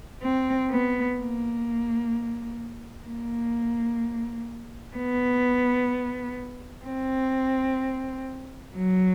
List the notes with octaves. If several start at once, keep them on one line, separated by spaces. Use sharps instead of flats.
C4
B3
A#3
A#3
B3
C4
F#3